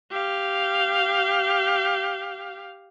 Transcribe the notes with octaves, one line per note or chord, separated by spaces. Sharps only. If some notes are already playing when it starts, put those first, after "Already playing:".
G4 F5